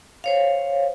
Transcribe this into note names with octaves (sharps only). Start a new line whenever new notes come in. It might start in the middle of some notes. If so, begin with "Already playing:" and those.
C5 C#5 F5